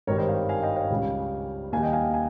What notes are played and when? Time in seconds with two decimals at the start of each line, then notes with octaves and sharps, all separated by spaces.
0.07 G#1 G2 D#3 G3 A#4 C#5
0.18 C5 D#5
0.28 C#5 F5
0.49 F5 G#5
0.62 D#5 G5
0.76 C#5 F5
0.90 C#2 C#3 G3
1.72 D#2 D#3 G3 F5 G#5
1.83 D#5 G5
1.93 F5 G#5
2.14 G#5